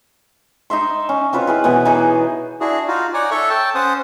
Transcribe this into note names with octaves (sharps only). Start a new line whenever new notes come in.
D#4 D#5 E5 C6
C#4
C4 F4 B4 C#5
E4 G#4 B4
B2 E3 B3 G#5
E3 D#4 G#4
D4 E4 F#4 G#4
D#4 F4 F#4
D#4 C#5 D5 F#5 G#5
A4 C#5 E5 C#6
G5 A5
C#4 C5 F#5 D#6